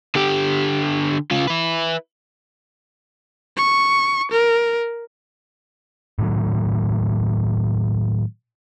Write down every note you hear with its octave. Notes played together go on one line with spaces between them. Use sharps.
D3 G4
C#3 F4
E4 B4
C#6
A#4
A2 D#3 F#3